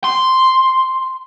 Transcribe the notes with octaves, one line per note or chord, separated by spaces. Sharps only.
C6